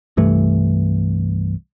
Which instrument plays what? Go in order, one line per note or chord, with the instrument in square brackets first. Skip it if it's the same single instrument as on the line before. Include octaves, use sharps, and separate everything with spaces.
[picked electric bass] C2 G2 E3 A3